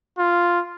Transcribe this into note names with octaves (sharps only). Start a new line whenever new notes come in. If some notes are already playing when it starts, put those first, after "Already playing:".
F4